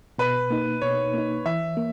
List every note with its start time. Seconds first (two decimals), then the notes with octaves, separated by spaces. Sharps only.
0.19 B2 B4
0.50 A#3 D#4
0.82 B2 C#5
1.14 A#3 D#4
1.46 E3 E5
1.77 A#3